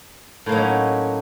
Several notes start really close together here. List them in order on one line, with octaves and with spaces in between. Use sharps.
A2 A#3 F#3 D#4 C#4